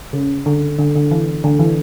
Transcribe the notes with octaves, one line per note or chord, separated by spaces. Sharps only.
C#3
D3
D3
D3
E3
D3
E3